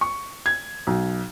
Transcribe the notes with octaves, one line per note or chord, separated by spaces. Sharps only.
C#6
G#6
B1